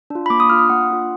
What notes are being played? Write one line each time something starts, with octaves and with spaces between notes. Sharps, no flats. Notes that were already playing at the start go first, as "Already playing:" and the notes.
D4 F4
B5
A#3 D6
D#6
D4 F4 F6
D#6
A#3 F#5
D4 F4